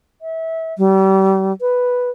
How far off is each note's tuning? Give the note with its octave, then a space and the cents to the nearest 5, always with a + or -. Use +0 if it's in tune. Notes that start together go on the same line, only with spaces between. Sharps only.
E5 -25
G3 -35
B4 +0